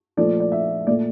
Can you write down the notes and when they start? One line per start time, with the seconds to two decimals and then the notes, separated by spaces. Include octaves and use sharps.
0.17 A#2 F3 A3 D5
0.40 D5
0.52 E5
0.87 A#2 A3 D5